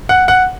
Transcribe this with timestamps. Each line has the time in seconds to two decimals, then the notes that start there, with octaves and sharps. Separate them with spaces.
0.09 F#5
0.28 F#5